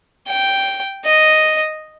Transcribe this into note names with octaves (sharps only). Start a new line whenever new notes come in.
G5
D#5